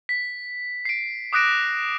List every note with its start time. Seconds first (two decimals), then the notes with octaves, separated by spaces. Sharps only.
0.09 B6
0.85 C7 D7
1.33 D6 D#6 F#6 A#6 D7 E7